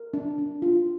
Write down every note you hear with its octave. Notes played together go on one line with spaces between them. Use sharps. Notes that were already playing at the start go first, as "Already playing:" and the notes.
Already playing: A#4
D4
D4
F4